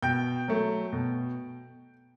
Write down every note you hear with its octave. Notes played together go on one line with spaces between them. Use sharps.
B2 G5 G6
F#3 A3
B2